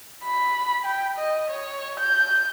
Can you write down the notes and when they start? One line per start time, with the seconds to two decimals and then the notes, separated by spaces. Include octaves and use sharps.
0.24 B5
0.85 G5
1.17 D#5
1.51 C#5
2.00 G6